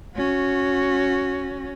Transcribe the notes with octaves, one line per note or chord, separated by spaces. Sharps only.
C#4 F#4